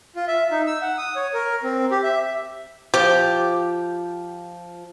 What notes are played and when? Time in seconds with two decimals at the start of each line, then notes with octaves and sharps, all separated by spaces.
0.16 F4
0.28 E5
0.51 D#4
0.67 E6
0.82 F#5
0.98 D#6
1.16 C#5
1.34 A#4
1.63 C4
1.91 G4
2.03 E5
2.94 F3 G4